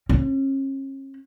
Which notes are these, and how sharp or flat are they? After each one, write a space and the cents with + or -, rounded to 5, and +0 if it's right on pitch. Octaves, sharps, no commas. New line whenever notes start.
C#4 -40